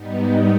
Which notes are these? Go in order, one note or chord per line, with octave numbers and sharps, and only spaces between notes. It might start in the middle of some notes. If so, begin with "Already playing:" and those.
Already playing: G#2 G3 B3 D#4